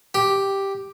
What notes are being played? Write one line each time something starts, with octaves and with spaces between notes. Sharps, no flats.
G4